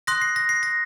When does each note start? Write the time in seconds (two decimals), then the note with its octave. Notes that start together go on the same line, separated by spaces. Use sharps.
0.07 C6 D#6 F#6 A#6
0.21 C7
0.36 A#6
0.49 C7
0.63 A#6